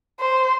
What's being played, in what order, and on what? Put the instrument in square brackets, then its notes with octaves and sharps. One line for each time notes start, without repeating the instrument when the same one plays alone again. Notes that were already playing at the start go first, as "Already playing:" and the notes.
[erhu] C5